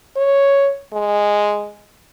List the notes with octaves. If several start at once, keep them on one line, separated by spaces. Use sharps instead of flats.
C#5
G#3